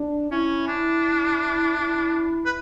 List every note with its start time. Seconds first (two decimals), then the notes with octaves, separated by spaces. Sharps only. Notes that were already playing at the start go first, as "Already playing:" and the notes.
Already playing: D4
0.31 C#4 E4
0.67 D4
1.77 E4
2.46 B4